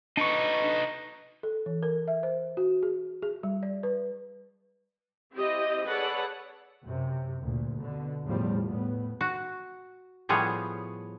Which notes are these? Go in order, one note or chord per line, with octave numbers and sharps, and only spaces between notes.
D4 D#4 B4 C#6
A4
E3
A#4
E5
C5
F#4
G#4
G#4
G3
D5
B4
C4 E4 G4 D#5
G#4 A4 B4 C#5 D5 F#5
F#2 C3
D2 A#2
B2 D3
E2 A2 F3 G3
A2 B3
F#4
A2 F3 G3 B3 G#4 C#5